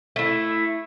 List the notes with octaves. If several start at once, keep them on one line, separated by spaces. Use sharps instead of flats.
A3 E4